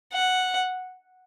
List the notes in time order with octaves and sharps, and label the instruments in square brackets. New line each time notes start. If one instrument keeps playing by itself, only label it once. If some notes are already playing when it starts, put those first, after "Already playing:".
[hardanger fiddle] F#5